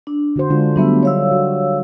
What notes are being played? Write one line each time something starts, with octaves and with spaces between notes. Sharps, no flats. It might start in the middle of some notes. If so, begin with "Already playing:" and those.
D4
D3 F#4 C5
D3 G#3 D4 F4
F#3 G3 A3 B3 D4 E5
C#5 F5 E6
F#4